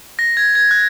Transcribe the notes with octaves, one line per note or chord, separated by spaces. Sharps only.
A#6
G#6
G#6
F#6